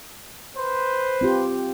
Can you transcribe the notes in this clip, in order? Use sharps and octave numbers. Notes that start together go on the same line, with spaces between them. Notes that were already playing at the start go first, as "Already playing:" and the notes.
B4 C5
C4 F4 G4